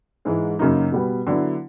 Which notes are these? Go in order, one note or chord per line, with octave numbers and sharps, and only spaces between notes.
G#2 E3 G#3
F#2 C#3 F#3 A#3 D#4
B2 G3 B3
D3 F#3 B3 E4